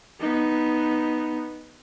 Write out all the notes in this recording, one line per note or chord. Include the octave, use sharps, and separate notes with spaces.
B3 D#4